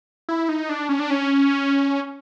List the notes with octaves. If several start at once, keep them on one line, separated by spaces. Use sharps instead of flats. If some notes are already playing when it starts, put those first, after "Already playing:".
E4
D#4
D4
C#4
D4
C#4